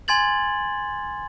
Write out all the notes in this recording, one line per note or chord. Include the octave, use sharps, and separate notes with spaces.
G#5 C6 G#6 A6 F#7